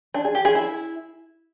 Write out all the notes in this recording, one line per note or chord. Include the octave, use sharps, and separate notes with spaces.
D4
G#4
G4
G#4
E4